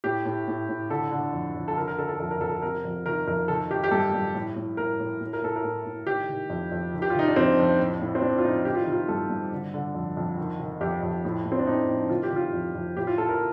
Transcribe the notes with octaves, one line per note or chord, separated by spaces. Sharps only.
A2 G4
A2
A2
A2
D3 A4
D3
F2
F2
A4
D3 A#4
A#4
D3 A4
A4
F2 A4
A#4
F2 A4
A4
C3 A#4
F2
D#3 A#4
F2 A#4
D#3 A4
D#3 G4
G4
G2 A4
G2
A2
A2
A2 A#4
A2
A2
A#4
A2 A4
A#4
A2
A2
D#3 G4
D#3
F2
F2
D#3
G4
F4
D#3 D#4
D4
F2 C4
F2
A2
A2
C4
A2 D4
F4
A2 D#4
D#3 G4
F4
D#3 D#4
F4
G2 A4
G2
D3
D3
F2
F2
D#3
D#3
F2 G4
F2
A2
A2
C4
D4
A2 D#4
A2
D#3 F4
G4
D#3 F4
F2
F2
A2 G4
F4
A2 A4
A#4